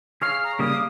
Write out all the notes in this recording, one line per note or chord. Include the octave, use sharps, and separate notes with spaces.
G#4 C#5 F5 F6
A#5
C#3 G3 A#3 D#6
F5 D6